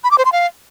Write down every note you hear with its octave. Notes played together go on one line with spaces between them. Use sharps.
B5
D6
C5
C6
F5